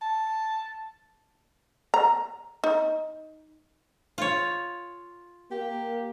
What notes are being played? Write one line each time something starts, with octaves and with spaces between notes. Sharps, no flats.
A5
A#5
D#4
F4 C#5
A#3 G4